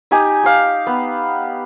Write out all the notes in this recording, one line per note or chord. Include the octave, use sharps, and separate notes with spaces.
D#4 G4 G#5
G4 F5
B3